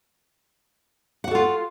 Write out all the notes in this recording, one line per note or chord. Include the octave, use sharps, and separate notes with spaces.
F4 F#4 A4 F#5